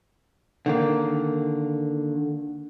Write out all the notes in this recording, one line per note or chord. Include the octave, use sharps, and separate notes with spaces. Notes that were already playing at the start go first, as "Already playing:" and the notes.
D3 D#3 A#3